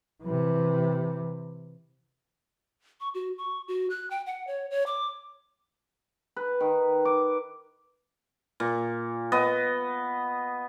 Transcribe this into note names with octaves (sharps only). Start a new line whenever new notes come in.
C3 E3
C#6
F#4
C#6
F#4
F#6
G5
F#5
C#5
C#5
D6
B4
D#3
D6
A#2
B3 D#5